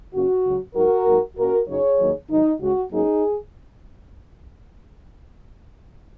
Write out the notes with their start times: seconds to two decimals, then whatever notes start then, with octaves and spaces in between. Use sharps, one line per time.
0.14 F#2 C#3 A#3 C#4 F#4
0.45 C#2 C#3 F#3
0.75 G#2 F#3 D#4 F#4 A#4
1.07 G#2 F#3 A#3 D#4
1.37 A#2 A#3 C#4 F#4 A#4
1.68 F#2 C#3 F#3 D#4 G#4 C#5
2.00 D#2 D#3 F#3 A#3 D#4
2.30 G#2 D#3 F#3 D#4
2.61 C#2 C#3 G#3 C#4 F#4
2.92 G#2 F#3 A#3 C#4 D#4 G#4